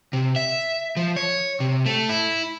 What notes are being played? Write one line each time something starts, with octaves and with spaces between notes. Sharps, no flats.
C3
E5
F3
C#5
C3
A3
E4